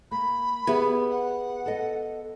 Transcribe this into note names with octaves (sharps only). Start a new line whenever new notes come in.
A#3 B5
B3 G4 G#4 E5
F#5
A4 D#5